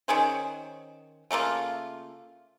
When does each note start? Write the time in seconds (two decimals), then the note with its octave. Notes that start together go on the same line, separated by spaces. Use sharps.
0.08 D#3 C#4 G#4 C5
1.31 C#3 A3 A#3 F4